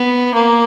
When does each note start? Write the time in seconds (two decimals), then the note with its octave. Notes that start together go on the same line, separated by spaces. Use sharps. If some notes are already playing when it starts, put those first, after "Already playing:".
Already playing: B3
0.34 A#3